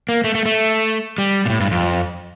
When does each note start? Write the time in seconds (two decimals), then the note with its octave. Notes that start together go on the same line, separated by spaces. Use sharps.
0.09 A#3
0.24 A3
0.35 A3
0.46 A3
1.18 G3
1.46 A#2
1.50 A2
1.60 G2
1.71 F2